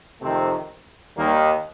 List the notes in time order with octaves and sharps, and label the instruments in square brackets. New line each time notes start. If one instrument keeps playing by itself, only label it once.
[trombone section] F2 C3 D#3 A3 C4
D#2 D#3 G3 A#3